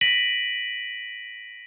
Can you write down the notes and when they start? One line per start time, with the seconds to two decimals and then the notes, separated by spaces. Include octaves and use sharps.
0.01 A#6 B6 D7 D#7 F#7